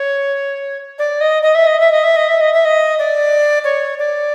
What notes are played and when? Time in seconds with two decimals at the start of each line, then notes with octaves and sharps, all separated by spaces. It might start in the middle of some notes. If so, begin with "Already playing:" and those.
Already playing: C#5
0.98 D5
1.20 D#5
1.42 D#5
1.54 E5
1.66 D#5
1.79 E5
1.91 D#5
2.03 E5
2.16 D#5
2.28 E5
2.40 D#5
2.53 E5
2.65 D#5
2.98 D5
3.64 C#5
3.98 D5